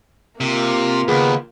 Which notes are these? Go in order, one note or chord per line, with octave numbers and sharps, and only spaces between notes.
C3 A#3 F4
D#2 C#3 B3 G#4